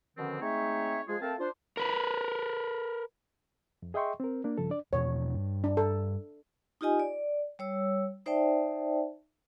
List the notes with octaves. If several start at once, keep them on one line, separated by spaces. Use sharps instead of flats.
B2 D3 D#3 F3 C4 C#4
G#3 A3 C4 D#4 C#5 E5
F3 G#3 F4 G#4
A3 C4 A#4 F5 A5
D4 F4 C5
A#4 B4
F2
G#4 D#5 E5 G5 C6 C#6
C4 A#4
A#3 D4
G2 C#3 F3 A4
D4 D5
E2 B2 F3 C#5
G2
D4
A4
D#4 F4 G4 D#5 G#5
D5
G3 C#5 E6
D#4 C5 D5 E5 G5 A5